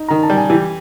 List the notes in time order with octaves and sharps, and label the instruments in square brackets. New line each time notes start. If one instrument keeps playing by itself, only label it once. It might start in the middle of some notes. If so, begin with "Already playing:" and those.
Already playing: [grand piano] D#4
[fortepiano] D#3 [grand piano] A#5
[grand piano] A5
[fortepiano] G3
[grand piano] G#5
[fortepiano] E3 [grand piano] G4 G5